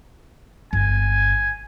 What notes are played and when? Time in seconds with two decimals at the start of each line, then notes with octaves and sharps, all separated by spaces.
0.73 G1 G#5